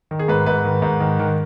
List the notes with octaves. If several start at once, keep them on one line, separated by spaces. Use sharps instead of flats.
D#3
G#4
G#2 B4
G#2 B4
D#3
G#2
D#3
D#3